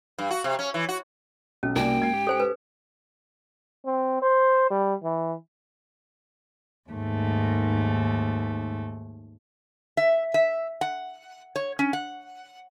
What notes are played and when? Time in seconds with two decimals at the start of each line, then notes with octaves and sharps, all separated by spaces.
0.18 G2
0.30 F#4
0.44 C3
0.59 C#4
0.74 E3
0.89 F#4
1.63 B1 C#4
1.76 C2 A#3 D#4 F#4 A#4 D5 G5 G#5
2.00 G#2 G#6 C7
2.13 G4
2.27 A4 C5 G#5
2.40 B4
3.86 C4
4.22 C5
4.70 G3
5.04 E3
6.90 D#2 G#2 A3
9.97 E5
10.34 E5
10.81 F#5
11.56 C#5
11.79 C#4
11.93 F#5